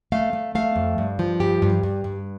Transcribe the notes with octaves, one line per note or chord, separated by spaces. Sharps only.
A3 F5
A3
A3 F5
F2
G2
F3
G2 G4
G2
G2
G2